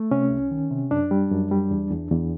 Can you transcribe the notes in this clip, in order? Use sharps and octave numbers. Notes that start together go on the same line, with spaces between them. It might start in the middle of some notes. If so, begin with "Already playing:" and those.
Already playing: A3
C3 C#4
C2
D#3
C3
F#2 D4
G3
F#2
G3
E2
E2
E2